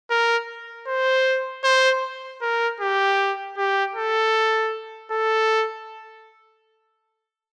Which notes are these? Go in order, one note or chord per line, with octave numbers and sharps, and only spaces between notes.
A#4
C5
C5
A#4
G4
G4
A4
A4